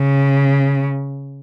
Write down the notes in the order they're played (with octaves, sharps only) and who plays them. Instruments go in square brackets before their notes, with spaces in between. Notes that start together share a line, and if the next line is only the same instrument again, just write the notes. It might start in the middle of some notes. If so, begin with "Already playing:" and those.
Already playing: [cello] C#3